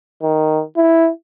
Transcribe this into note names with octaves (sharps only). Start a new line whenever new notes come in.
D#3
E4